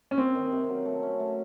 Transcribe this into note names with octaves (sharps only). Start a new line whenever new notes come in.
C#4
A#3 C4
D#3
C3
F#3
A3
C#4
A3